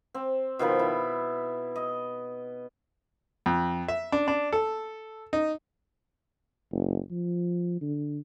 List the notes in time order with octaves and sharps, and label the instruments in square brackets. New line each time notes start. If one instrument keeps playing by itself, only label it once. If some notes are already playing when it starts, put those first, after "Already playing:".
[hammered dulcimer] C4
B2 D#3 F3 B5
E4
D#5
[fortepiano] F2
E5
D4
D4
A4
D#4
[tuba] F#1
F3
D3